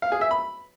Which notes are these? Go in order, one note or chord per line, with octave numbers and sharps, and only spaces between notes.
F5
G#4
E5
B5